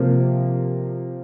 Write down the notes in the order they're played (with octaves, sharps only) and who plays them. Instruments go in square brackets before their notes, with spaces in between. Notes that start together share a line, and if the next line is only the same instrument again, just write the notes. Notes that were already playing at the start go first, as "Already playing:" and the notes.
Already playing: [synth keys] C3 F3 A#3